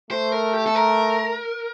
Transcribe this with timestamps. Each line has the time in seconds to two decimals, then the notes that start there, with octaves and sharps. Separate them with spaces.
0.11 A3 C5
0.32 A#4
0.53 G4
0.67 A4
0.75 A#4